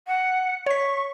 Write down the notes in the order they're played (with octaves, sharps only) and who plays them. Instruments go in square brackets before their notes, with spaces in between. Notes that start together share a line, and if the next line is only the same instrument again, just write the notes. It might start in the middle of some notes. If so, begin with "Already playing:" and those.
[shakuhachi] F#5
[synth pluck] C#5 B6 [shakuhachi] C#6